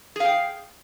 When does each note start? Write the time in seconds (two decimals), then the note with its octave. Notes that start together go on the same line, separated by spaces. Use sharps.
0.16 G#4
0.20 F5
0.25 G5